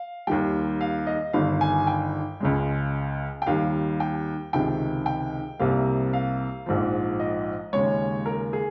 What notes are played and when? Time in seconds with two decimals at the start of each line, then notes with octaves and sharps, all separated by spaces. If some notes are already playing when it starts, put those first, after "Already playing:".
Already playing: F5
0.27 D#2 D#3 G3 G5
0.81 F5
1.07 D#5
1.33 G1 G2 D#3 F5
1.61 G#5
1.87 G5
2.40 C#2 C#3 G#3
3.42 G5
3.46 D#2 D#3 G3 F5
4.00 G5
4.53 C#2 C3 D#3 G5
5.06 G5
5.59 C2 C3 G3 A#3 F5
6.13 F5
6.66 A#1 G#2 F3
7.20 D#5
7.73 D#2 C#3 G#3 C#5
8.26 A#4
8.53 G#4